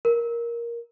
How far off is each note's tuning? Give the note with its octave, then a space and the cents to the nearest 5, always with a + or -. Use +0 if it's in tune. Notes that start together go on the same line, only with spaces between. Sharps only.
A#4 +10